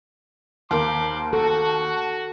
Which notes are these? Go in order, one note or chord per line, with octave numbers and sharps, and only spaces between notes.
D#2 A#4 C5 F5 B5 C6 D6
F#4 A4